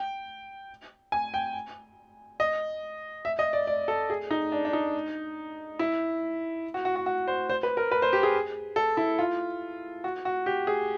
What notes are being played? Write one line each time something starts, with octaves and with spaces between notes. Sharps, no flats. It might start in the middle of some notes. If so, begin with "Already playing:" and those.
Already playing: G5
G#5
G5
D#5
E5
D#5
D5
D5
A4
G#4
D#4
D4
D4
D#4
E4
F#4
F#4
F#4
F#4
C5
C5
B4
A#4
B4
C5
G4
G#4
A4
E4
F4
F#4
F#4
G4
G#4